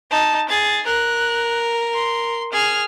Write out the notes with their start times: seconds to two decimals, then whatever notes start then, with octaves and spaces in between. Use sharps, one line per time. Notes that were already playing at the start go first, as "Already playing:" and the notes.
0.11 D#4 A5
0.49 G#4 A6
0.86 A#4 F#6
1.94 C6
2.53 G#4 F6